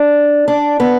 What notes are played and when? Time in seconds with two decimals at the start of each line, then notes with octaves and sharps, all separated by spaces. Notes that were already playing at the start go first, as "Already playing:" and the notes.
Already playing: D4
0.48 D4
0.80 B3